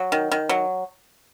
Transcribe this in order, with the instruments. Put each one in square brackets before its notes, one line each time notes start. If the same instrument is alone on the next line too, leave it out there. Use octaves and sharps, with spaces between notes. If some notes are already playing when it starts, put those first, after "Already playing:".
Already playing: [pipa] F#3
D#3
D#3
F#3